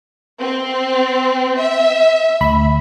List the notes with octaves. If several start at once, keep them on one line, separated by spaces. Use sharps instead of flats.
C4
E5
D2 B5